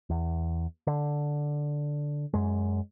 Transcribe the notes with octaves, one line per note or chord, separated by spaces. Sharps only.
E2
D3
F#2 G#3